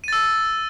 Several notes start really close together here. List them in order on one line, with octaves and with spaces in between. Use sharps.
D#7 A6 E6